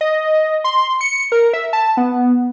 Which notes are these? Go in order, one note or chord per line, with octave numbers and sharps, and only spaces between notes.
D#5
C6
C#7
A#4
E5
A5
B3